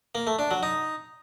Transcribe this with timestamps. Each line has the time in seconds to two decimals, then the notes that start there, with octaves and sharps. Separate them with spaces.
0.15 A#3
0.27 A3
0.39 D4
0.51 F#3
0.63 D#4